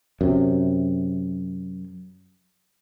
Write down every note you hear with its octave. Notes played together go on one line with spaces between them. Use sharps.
F#2 C3